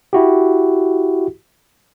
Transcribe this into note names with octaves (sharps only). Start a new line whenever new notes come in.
E4 F#4 G4